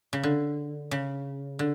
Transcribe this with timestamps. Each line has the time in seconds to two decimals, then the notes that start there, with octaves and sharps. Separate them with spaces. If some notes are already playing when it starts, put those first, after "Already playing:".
0.13 C#3
0.23 D3
0.91 C#3
1.59 D3